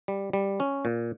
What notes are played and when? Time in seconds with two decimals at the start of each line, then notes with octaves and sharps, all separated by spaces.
0.08 G3
0.33 G3
0.60 C#4
0.85 A#2